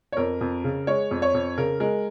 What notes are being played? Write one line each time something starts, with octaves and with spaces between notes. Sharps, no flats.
C#5
F2 A#4
F2
C#3
G#3 C#5
F2
C#5
F2
C#3 A#4
G#3 A#4